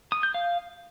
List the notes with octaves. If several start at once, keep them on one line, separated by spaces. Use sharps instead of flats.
D#6
G6
F5